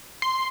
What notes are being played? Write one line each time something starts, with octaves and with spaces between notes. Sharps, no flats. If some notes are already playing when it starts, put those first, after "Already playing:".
C6